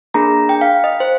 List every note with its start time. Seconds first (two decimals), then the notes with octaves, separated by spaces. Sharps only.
0.14 A#3 D4 G#4 A#5
0.49 G5
0.61 F5
0.66 G5
0.84 D#5
1.00 C5